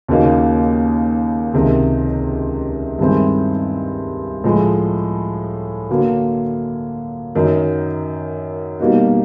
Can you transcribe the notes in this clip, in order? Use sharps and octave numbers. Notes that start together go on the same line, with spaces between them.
D#2 C#3 F#3 A#3 D#4
C#2 C3 D#3
G2 D#3 G#3 C4 E4
A2 F3 G#3
D3 F#3 A#3
F#2 D#3 F#3
B2 G3 A#3 D#4 F#4